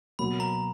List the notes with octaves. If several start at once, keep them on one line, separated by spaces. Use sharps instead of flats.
B2 F#3 A#3 B5
A#5